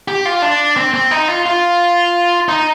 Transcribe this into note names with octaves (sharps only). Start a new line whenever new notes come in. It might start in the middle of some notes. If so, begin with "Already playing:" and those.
G4
F4
D4
C4
C4
D#4
F4
F4
D#4